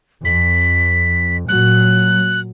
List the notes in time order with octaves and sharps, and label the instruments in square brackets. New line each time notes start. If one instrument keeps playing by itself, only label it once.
[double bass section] F2 [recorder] B6
[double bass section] A#2 F#3 [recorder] F#6